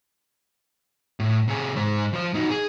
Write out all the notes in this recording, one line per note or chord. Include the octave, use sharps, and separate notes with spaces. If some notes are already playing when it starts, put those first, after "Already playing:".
A2
C3 G#4
G#2 C5
F3 C5
D#4 F#4
G#4